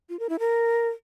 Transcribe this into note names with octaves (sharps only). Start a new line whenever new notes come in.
F4
A#4
E4
A#4